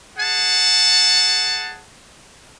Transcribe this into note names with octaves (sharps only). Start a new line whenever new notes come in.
G#4 F#5 A5